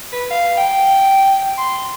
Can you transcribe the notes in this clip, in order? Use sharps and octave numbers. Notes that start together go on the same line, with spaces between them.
B4
F5
G5
C6